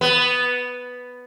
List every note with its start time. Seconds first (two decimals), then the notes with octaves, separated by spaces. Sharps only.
0.01 B3